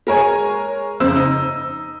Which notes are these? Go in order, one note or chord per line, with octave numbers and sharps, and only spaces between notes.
G#3 A#4 C#5 G#5
F2 C#3 C5 E6
D#4